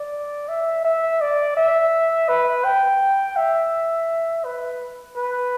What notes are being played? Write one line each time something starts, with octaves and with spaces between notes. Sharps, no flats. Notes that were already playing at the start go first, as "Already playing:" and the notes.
Already playing: D5
E5
E5
D5
E5
B4
G5
E5
B4
B4